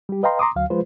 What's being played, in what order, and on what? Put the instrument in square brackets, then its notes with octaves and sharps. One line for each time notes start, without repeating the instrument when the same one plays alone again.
[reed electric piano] G3 G4
B4 D#5 F5 G5 A#5 C6
A#5 C6 D6 D#6
D2 F#3 F5
F3 G#3 F4 B4 C5